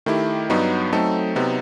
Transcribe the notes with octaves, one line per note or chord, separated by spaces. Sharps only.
D#3 A3 E4 G4
G2 F#3 B3 D#4
F#3 A3 C4 D#4 A4
C3 F#3 B3 D#4